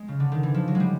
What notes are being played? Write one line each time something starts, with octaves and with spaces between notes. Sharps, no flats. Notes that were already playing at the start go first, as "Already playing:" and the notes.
Already playing: G#3
C#3
D3
D#3
E3
F3
F#3
G#3
G3